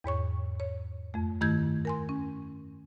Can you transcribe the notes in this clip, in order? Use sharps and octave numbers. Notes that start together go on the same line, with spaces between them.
E2 G#2 C#5 C#6
C#5
F2 A3
G2 D#3 A3 E4 G6 G#6
A#4 G#5 C6
C#4